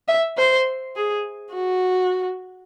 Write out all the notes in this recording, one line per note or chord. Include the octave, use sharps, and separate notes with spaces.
E5
C5
G#4
F#4